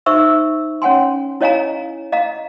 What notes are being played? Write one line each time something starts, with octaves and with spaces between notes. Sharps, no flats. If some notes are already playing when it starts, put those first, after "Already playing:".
D#4 C5 E5 C#6 E6
C#4 C#5 F#5 G#5 C6
E4 C#5 D#5 F5 G#5 A#5
D#5 F5 A#5